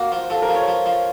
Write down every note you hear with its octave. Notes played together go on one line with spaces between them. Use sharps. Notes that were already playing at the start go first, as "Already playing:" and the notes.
Already playing: A#3 F#4
F3
F3 A4
A#4
F3
C#5
F3
F3